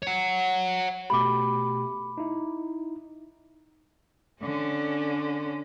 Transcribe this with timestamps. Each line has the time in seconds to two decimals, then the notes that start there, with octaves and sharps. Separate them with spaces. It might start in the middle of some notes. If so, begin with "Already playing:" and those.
0.02 C#5 F#5
1.10 B2 A3 G4 B5 D6
2.18 D#4 E4
4.41 D3 C#4